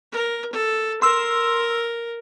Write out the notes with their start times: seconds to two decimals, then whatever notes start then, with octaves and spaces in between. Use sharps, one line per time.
0.12 A#4
0.53 A4
1.02 A#4 C6 E6